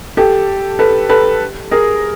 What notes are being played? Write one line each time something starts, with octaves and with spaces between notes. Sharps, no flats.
G4 A4
A4 B4
A4 B4
G#4 A#4